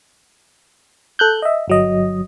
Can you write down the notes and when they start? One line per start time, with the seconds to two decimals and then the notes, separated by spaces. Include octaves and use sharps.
1.19 A4 F#6 G6
1.42 D#5 E5
1.68 G1 F#3 D#5